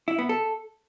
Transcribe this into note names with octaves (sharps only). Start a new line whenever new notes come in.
E4
B3
A4